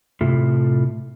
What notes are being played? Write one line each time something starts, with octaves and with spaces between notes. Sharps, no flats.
A2 C3 E4 F4 A4